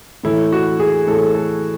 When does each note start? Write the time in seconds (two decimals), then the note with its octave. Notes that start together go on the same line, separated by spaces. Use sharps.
0.24 A2 E3 A3 E4
0.52 F#4
0.80 G#4
1.07 A2 E3 A3 A4
1.35 A4